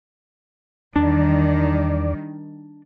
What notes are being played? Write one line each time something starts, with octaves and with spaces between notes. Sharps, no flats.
E2 D#3 G3 D4 D5